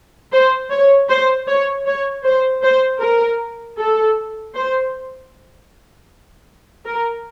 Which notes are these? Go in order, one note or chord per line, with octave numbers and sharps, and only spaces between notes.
C5
C#5
C5
C#5
C#5
C5
C5
A#4
A4
C5
A#4